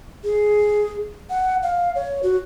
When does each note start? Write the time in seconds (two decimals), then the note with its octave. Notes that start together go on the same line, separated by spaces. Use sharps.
0.24 G#4
1.30 F#5
1.63 F5
1.95 C#5
2.23 F#4